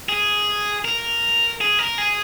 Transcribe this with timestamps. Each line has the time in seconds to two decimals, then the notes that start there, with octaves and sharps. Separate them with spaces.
0.09 G#4
0.85 A#4
1.61 G#4
1.79 A#4
1.98 G#4